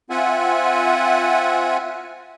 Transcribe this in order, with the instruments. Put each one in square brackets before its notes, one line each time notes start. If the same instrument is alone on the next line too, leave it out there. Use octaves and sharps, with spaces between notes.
[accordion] C4 F4 E5 F#5 G#5